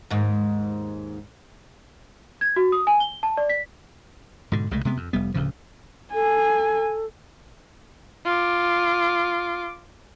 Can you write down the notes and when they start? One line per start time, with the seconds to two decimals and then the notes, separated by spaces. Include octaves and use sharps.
0.10 D#2 G#2
2.41 G#6
2.56 F#4
2.72 D#6
2.87 G#5
3.00 G7
3.23 A5
3.37 D5
3.49 B6
4.52 G#2 B2 D3
4.71 C2 C#3 G#3 A3
4.85 C3 G#3 B3
4.97 F2
5.13 F1 G3 B3
5.34 D1 D2 C#3 F3
6.14 A4 G#5
8.25 F4 D6